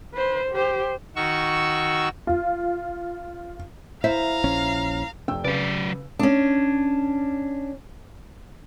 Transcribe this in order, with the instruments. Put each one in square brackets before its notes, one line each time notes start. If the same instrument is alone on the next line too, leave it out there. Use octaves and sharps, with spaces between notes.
[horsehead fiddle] B4 C5
G4 C5
[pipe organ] D#3 F#4 C#6 E6
[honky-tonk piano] F4
[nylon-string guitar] E4 C5 E5 [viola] F5 A#5
[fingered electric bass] A#1 C#4
[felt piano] F1 G5 E6
[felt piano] C#3 B4 F5 [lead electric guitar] F#3 D5
[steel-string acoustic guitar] C#4 D4